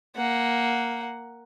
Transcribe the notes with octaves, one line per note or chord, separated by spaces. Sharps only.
A#3 F#5